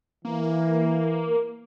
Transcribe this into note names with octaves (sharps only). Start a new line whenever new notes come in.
E3 A#3